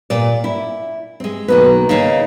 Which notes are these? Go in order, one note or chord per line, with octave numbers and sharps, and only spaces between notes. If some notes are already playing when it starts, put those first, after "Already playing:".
A#2 D5
E4
G#3 C4
B1 D#3 A#3 B4
C#3 A#3 D#4